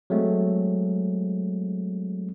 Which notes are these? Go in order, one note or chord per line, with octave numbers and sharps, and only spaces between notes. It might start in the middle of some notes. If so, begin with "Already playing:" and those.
F#3 G#3 A3 C4